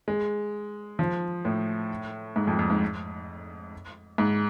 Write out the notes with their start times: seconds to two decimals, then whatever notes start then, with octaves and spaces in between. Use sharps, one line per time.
0.08 G#3
0.99 F3
1.45 A2
2.36 G#2
2.47 F2
2.59 F2
2.70 G#2
4.18 G#2